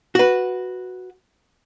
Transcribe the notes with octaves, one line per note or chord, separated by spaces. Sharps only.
F#4 B4